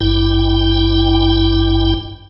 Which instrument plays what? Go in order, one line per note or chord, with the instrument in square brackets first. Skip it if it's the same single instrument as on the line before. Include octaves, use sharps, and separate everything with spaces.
[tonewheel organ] G#1 G2 E4 G5